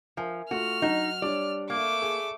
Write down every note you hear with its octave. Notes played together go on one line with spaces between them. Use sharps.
F3 A#4 E5 G#5
A3 F4 F#4 F6
F#3 D#4 F#5 E7
G3 D4 C#5 D5
A3 A#3 D6
G#4